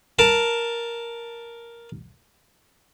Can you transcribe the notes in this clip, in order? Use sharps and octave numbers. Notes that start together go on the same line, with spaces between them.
A#4 A5